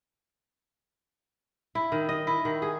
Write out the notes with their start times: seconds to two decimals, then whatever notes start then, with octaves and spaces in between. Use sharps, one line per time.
1.75 E4
1.92 D#3
2.09 D#5
2.27 E4
2.45 D#3
2.62 G#4